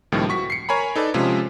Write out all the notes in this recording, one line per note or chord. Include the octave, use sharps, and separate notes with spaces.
C#2 A2 D#3 F3 G3 A#3
F#4 C#6 B6
C7 C#7
A#4 C#5 G#5 A#5 B5
D#4 A4 B4 D5
C3 F3 G#3 C#4 F4 G#4